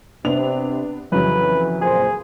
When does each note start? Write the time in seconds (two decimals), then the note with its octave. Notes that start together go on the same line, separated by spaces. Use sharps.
0.25 C3 B3 D4 F7
1.12 F2 C#3 E3 F#3 B4
1.81 A#2 G#4 C5